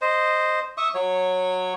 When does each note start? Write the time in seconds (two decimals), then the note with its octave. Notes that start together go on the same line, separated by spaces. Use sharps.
0.01 C5 D#5
0.77 E5 C#6 D#6
0.95 F#3 C#5